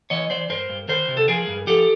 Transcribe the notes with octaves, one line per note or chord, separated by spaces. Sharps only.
E3 C#5 D#5
E3 C5 D5
G2 A#4 C5
G2
D#3 A#4 C5
C3
A4
F3 G#4 A#4
G2
F3 G4 A4